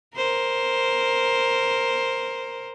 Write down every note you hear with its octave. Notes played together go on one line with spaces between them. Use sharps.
A#4 C5